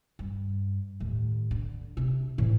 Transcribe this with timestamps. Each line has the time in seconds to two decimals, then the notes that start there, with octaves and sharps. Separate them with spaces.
0.19 G2
1.00 D#2 A2
1.51 D3
1.97 C3 D4
2.38 A2 E3